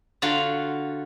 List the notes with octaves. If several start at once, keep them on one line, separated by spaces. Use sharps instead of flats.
D3 F4 F#4 A#5 C6